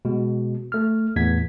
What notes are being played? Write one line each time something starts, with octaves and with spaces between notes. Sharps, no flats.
B2 G#3
A3 F6
E2 A2 G#6 B6